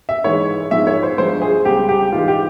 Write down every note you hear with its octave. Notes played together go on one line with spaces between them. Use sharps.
E5
G#2 E3 G#3 C#5
G#2 F3 G#3 E5
C#5
C5
G2 F3 G#3 C5
G#4
C#2 C#3 G3 G4
G4
G#2 E3 G#3 F4
G4